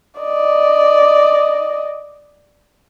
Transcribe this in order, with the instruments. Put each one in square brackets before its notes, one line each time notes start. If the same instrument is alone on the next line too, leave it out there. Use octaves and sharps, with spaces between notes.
[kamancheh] D5 D#5